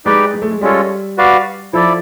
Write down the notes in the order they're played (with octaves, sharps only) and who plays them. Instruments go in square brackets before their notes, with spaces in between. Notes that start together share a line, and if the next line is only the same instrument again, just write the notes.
[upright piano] G#3 [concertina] D#4 G4 B4 D5 G5
[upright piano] G#3
A3
G#3
[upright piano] G3 [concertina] G#3 C#4 F4 A4 C#5
[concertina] F#4 B4 D5 F5
[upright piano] F3 [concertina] E4 A4 D5